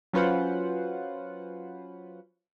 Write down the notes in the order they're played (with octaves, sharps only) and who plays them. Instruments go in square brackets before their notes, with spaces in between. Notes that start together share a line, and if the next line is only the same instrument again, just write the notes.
[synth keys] F#3 C#4 F4 B4 C5 F#5